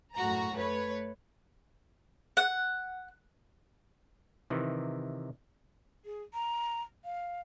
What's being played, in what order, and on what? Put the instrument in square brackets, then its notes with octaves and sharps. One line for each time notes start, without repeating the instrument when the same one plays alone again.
[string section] F#2 A2 F#4 A#5
A3 B4 C#5
[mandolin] F#5
[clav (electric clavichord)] C3 D#3 E3
[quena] G#4
A#5
F5